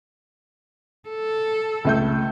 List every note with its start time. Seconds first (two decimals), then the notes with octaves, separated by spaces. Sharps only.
1.09 A4
1.85 C#2 A3 G6